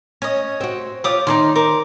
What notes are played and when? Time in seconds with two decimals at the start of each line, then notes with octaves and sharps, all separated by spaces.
0.22 C#4 C#5 D#5
0.60 C4 F#4
1.04 F4 G4 C#5 D6 D#6
1.27 D#3 D#4 G#4 D5 C6
1.56 A#4 C5 D6